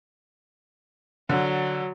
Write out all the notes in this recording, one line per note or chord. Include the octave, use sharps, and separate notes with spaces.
D3 F#3